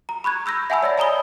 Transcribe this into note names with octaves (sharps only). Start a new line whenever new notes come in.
A#5
B5 C#6 F#6 G#6
B5 E6 G6 A#6
E5 F#5 G#5 A5 B5 E6
C#5 D5 B5 A#6
D#5 G#5 A#5 B5 D#6 G7